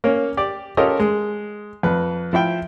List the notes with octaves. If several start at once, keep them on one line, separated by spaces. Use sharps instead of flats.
A#3 C#4
G4 D5
C#4 F4 G4 A4 A#4 D#5
G#3
F2 B4
F3 E4 E5 G5